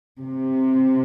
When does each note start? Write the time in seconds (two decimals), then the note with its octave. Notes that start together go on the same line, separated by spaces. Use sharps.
0.21 C3